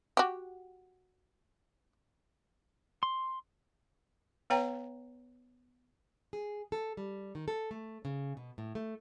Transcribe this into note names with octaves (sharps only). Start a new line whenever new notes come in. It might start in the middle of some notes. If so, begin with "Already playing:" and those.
F#4 G4
C6
B3 B4 C#5 G5 A#5
G#4
A4
G3
D#3
A4
A3
C#3
B2
A2
A3